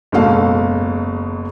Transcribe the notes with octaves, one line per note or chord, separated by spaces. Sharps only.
F#1 G#2 B2 A4 F5